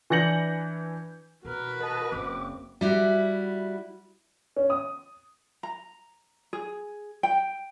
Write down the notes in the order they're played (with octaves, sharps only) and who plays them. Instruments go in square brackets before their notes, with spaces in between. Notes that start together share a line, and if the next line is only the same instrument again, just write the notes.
[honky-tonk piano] E3 D4 G6 A#6 C#7 F#7
[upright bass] B2 [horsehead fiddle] F#4 B4 [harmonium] A#4
[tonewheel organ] A#4 A5 [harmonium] D#5
[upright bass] F#1 [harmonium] C4 [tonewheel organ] D6
[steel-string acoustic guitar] G3 E4 F#4
[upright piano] C#4
D#6
[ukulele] A#5
G#4
G5